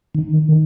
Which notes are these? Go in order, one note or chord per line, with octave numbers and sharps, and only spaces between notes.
D#3